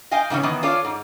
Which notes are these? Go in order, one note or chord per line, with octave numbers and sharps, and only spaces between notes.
D#5 F5 G5 G#5
G#2 C#3 E3 C#4
D#3 E3 B3
F4 A4 C#5 D5 F5
G#2